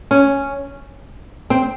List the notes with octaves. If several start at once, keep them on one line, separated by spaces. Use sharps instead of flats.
C#4
C4